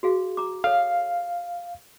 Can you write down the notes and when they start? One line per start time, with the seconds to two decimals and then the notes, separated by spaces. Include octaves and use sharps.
0.03 F#4 G#4 F5
0.37 A#5 D6
0.64 A4 C#5 F5